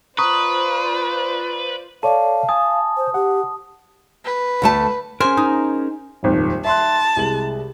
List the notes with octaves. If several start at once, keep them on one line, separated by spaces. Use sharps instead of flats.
F4 B4 C5 D5 A#5 C#6 D#6
A4 C#5 D5 F5 A5
G#5 A5 D#6
C5
G4 F#5
B4
D2 A3 A5
C#4 G#4 A#4 C5 G#5
D#4
D#1 G#1 F2
E5 A5 C6 F#6
C2 G#3 F#7